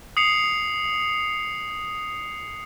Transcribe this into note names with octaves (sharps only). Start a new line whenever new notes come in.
D#6 C7 C#7 F7